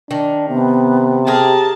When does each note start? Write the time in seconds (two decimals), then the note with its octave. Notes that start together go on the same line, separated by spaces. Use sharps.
0.11 D#3 D4
0.49 C3 B3
1.27 G4 G#4 A#4 A5